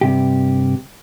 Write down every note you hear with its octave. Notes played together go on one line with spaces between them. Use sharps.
G2 C3 G4